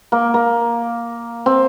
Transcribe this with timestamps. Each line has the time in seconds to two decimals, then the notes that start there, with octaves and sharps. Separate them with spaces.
0.12 A#3
0.34 A#3
1.46 C4